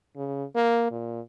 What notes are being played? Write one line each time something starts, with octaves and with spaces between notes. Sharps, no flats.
C#3
A#3
A#2